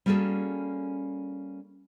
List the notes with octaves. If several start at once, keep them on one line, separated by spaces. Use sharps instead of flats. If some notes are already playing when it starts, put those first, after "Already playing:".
G3 A#3 C#4 F#4 G#4 A4